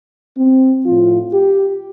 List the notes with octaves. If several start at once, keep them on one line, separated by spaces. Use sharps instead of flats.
C4
A2 F3 F4
G4